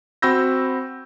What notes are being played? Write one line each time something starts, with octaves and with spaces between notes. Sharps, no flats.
C4 F#4 B5 E6 G6 A#6